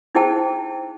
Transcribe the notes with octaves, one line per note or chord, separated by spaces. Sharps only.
D#4 E4 G#4 C5 G5 A5